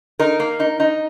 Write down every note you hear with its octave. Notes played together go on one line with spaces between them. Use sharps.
D#4 A#4
A#3
D#4
D#4